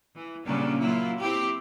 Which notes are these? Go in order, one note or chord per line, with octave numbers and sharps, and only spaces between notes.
E3
A#2 C#3 F#3 G3 C#4 D4
F#3 A#3 E4 F4
C4 E4 G4